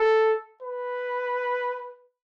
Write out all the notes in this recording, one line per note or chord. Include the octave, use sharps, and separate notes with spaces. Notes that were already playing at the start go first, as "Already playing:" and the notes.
Already playing: A4
B4